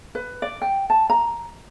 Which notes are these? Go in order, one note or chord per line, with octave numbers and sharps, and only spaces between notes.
B4
D5
G5
A5
A#5